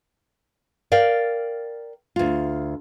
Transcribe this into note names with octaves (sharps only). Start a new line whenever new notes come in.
A#4 D5 F5 G5
D2 F4